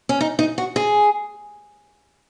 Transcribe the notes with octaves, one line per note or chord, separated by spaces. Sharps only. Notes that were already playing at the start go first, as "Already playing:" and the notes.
C#4
D#4
D#4
F#4
G#4